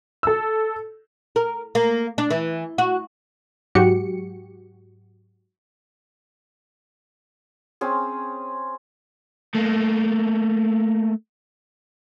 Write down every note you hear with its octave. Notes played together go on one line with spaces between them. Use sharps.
A4 E6
A#4
A#3
D4
E3
F#4
G#2 F#3 F#4 G4 C#7
C4 C#4 G#4
A3 A#3